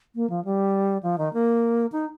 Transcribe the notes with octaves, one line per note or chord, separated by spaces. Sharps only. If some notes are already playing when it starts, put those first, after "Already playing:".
A#3
F3
G3
F3
D#3
A#3
D#4